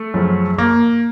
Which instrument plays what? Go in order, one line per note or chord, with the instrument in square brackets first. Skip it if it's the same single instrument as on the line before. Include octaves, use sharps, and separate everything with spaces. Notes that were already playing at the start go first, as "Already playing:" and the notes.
Already playing: [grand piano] A3
F#2 C#3 F3
A#3